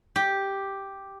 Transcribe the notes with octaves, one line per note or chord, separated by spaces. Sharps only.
G4